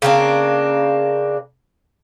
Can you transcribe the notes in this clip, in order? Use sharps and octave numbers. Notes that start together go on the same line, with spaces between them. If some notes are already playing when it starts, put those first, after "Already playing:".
C#3 A#3 C4 D4